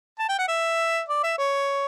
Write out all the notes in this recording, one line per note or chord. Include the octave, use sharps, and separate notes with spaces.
A5
G5
F#5
E5
D5
E5
C#5